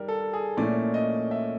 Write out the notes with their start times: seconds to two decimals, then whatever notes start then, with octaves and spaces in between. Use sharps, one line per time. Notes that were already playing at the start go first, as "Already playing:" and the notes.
Already playing: D#3 G3 A#4
0.08 A4
0.33 G#4
0.57 A#2 F3 A3 C#4 E4 D5
0.94 D#5
1.31 E5